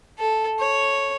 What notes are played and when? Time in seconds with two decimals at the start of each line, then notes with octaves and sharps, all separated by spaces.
0.19 A4
0.60 C#5